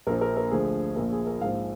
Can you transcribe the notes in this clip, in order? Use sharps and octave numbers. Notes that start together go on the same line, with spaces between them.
A#1 A#2 F3 A#4
A#4
A#4
D2 D3 F3 G#4
A#1 A#2 F3 A#4
G#4
A#4
A#1 G#2 F3 F5